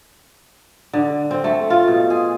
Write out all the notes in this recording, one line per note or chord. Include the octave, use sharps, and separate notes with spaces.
D3
C4
A3
F4
B2
G#4